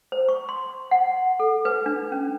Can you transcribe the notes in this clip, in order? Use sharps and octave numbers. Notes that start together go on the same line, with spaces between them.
C5
C#6
C6
F#5
A4
B4
D4
C#4